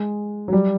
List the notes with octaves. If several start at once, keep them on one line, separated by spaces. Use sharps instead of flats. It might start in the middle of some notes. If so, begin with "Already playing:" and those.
Already playing: G#3
F#3
G3